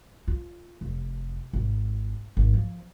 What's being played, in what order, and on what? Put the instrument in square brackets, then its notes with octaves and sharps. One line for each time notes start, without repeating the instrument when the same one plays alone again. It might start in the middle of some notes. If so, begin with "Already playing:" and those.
[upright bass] F4
F1
G#1
G#1
F3